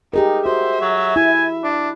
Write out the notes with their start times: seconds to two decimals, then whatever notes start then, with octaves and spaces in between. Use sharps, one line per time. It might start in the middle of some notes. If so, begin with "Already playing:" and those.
0.14 D#4 G4 G#4 A#4
0.46 F#4 C5 E5
0.81 F#3
1.16 E4 G#5
1.64 D4